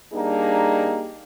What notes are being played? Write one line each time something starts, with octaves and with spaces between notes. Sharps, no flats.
G3 A#3 D4 D#4 G4 G#4